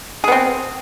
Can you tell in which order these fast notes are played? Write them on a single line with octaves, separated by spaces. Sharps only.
G#4 B3 C4